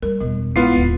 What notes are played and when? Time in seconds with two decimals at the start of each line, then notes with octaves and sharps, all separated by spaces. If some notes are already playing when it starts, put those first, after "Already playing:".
0.02 G3 A#4
0.21 E1 G3
0.56 A#1 G#3 B3 E4 F4 C7
0.74 D1 D#2